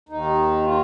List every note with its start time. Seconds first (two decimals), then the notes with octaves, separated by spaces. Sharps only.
0.09 D#2 D#3 D#4
0.63 F4